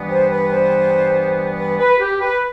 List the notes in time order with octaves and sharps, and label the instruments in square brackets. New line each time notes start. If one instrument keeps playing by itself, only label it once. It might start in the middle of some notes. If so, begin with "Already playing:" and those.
Already playing: [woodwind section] G2 E3 G3 B3
C5
B4
C5
B4
B4
G4
B4